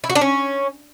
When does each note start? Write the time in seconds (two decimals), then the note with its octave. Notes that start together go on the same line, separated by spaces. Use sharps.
0.04 E4
0.10 F#4
0.15 D4
0.21 C#4